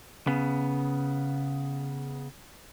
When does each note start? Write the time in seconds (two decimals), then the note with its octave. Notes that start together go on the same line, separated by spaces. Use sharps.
0.27 C#3 B3